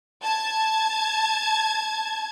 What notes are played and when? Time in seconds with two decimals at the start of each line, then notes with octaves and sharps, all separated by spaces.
0.23 A5 G#6